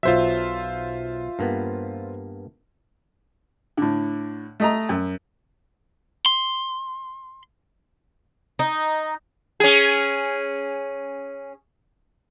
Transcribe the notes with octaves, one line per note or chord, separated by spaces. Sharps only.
B1 F#3 F4 C5 E5
G2 A#3 B3
A2 D3
A3 D#5 A#5
F#2
C6
D#4
C#4 G#4